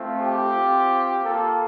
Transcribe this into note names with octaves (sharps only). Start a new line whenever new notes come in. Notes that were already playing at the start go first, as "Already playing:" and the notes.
Already playing: A3 C4 F4
G4
C4 F4
A#3 F4 A4